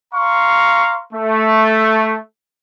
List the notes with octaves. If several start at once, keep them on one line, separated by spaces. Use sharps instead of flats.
F5 A#5 C6 C#6
A3